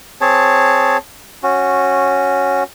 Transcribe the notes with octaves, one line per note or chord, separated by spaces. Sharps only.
C4 G#4 C#5 A5
C#4 F#4